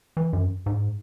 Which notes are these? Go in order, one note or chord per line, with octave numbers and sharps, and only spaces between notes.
E3
F#2
G#2